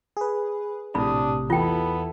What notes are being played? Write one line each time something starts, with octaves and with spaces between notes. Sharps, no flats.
G#4 B4
A#1 A2 C3 D4 G4 B5 D#6
E2 B3 E4 F4 A4 G5